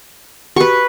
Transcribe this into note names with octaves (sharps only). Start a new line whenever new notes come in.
F#4 G4 B4 C#6